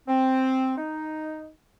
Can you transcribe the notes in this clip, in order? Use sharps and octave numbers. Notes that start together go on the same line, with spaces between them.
C4
D#4